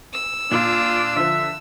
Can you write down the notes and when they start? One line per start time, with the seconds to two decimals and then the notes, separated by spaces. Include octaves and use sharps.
0.13 E6
0.51 A#2 D4 F4
1.16 D3 F3 E5